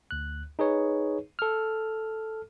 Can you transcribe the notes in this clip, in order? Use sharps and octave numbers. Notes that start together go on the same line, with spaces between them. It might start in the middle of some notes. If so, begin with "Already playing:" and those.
D2 F#6
D#4 G#4 B4 C#5
A4 F6